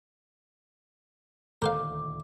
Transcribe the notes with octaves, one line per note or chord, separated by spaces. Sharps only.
D#1 D2 D#3 A4 A#4 C5 F5 D6